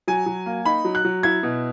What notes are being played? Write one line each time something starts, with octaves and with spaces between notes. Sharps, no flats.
F#3 G#5
F#3
A#3
D#4 B5
F#3
F#6
F#3
E4 G#6
B2